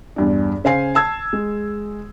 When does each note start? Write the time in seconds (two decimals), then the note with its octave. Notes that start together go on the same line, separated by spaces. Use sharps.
0.16 E2 G2 D4
0.64 C#3 C5 F5 G#5 C7
0.95 A5 E6 G#6
1.33 G#3